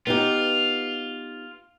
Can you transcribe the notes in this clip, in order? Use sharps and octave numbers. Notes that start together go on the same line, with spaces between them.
B3 D#4 F4 G4